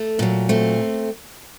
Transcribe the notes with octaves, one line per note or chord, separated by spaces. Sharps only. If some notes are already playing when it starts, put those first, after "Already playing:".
Already playing: A3
A#2 F#3
A3 C4